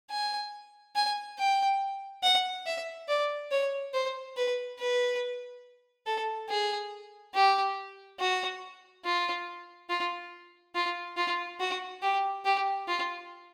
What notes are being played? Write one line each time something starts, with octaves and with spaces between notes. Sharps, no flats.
G#5
G#5
G5
F#5
E5
D5
C#5
C5
B4
B4
A4
G#4
G4
F#4
F4
F4
F4
F4
F#4
G4
G4
F4